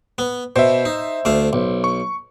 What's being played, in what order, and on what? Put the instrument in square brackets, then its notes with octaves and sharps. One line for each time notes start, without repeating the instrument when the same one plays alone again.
[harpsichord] B3
[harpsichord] B2 [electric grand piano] C5 E5
[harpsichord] D#4
D2 A3 F5
B1
[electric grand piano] C#6